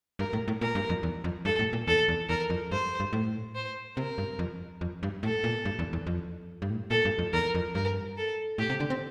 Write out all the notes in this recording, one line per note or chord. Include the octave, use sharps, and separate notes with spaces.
G2 A#4
A2
A2
A#2 A#4
G2
F2
E2
F2
G2 A4
A2
A#2
E2 A4
E2
E2 A#4
F2
G2 C5
G2
A2
C5
C3 A#4
G2
F2
F2
G2
A2 A4
A#2
G2
E2
E2
F2
G2
A2
A#2 A4
G2
F2
E2 A#4
F2
G2 A#4
A4
A2 G4
C3
D3
C4